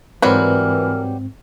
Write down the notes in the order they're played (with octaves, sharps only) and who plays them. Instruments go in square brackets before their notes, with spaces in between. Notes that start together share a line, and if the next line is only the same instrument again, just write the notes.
[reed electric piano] G#2 C4 [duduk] E3 [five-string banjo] F#3 G3 B4 [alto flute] A#4